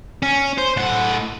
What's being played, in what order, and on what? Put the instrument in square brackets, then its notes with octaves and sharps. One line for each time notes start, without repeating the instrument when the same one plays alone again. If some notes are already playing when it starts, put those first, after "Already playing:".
[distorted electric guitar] C#4
C5
A2 F#5